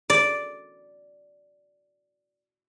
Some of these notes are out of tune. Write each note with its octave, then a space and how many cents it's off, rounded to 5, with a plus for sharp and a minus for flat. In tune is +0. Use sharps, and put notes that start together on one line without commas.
D5 -5